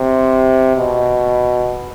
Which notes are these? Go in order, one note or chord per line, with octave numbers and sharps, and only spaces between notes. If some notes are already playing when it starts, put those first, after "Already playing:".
Already playing: C3
B2